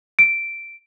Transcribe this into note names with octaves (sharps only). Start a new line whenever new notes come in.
D7